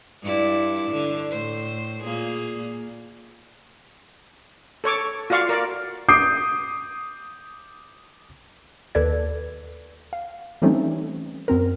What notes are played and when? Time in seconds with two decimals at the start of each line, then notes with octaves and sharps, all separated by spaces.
0.23 G2 E4 D5
0.91 D3
1.31 A2 C5
2.04 A#2 A#3 G#4
4.84 A4 C#5 C#6 D6
5.30 F4 F#4 D5 F5 C#6
5.49 A#4 D5
6.09 D6 D#6 G6 C7 D7
8.95 D#2 A4 B4 D5 G#6
10.13 F5
10.62 E3 G3 A3 C4 C#4 D#4
11.48 F#2 C4 A#4